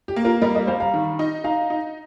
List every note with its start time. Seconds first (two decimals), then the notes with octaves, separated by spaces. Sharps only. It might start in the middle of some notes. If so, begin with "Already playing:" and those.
0.08 G4
0.16 A#3
0.24 F4 A#4
0.42 G3 A#4 D#5
0.55 A#4 D#5
0.67 G3 C5 F5
0.80 F5 A#5
0.94 D#3
1.19 D#4
1.44 D#4 F5 A#5
1.70 D#4